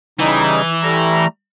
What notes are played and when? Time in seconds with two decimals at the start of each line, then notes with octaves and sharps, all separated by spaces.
0.19 C#3 E3 G3 D#4
0.82 G3 A3 A#5